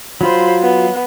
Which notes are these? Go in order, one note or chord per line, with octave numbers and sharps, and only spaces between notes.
F#3 F4 C5 B5
B3